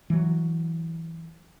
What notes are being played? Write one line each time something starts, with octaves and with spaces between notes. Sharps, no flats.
E3 F#3